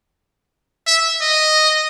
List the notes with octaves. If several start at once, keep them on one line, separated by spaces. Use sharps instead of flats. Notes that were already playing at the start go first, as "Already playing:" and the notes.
E5
D#5